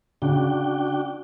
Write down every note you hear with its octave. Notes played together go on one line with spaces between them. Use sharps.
C#3 D4 F#4 G5